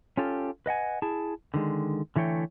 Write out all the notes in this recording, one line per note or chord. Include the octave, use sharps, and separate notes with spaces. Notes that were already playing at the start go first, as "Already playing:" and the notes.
C#4 F4 G4 A4
B4 D#5 F#5 G#5
E4 G#4 A5
D3 D#3 G#3
D3 E3 A3 C#5 G5